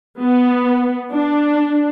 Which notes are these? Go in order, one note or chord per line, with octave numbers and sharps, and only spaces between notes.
B3
D4